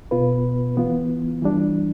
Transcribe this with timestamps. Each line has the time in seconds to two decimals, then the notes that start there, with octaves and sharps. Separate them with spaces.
0.11 B2 B3 F4 B4
0.77 E3 B3 F4
1.42 E3 G3 D4